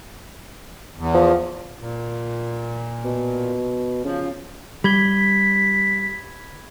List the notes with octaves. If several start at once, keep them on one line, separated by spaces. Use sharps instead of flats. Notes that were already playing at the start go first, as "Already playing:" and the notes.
E2
F3
A#2
B2
C#3 F3
G3 B5 G#6 B6 G7